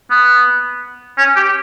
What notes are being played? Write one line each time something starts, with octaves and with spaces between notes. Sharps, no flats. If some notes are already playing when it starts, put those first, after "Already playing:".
B3
C#4
G4